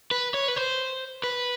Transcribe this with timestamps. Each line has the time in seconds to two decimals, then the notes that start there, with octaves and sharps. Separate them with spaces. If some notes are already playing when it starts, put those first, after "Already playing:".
0.11 B4
0.34 C#5
0.48 B4
0.56 C5
1.24 B4